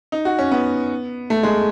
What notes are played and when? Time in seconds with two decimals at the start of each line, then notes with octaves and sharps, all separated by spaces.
0.12 D#4
0.25 F#4
0.39 C#4
0.52 B3
1.30 A3
1.43 G#3